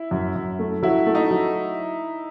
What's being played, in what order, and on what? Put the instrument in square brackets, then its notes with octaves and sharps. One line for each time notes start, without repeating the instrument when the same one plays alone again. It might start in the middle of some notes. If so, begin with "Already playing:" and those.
Already playing: [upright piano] E4
[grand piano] F#2
F#2
A3
[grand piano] F#3 [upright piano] E4
[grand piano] A3
[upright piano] D#4
[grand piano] F#3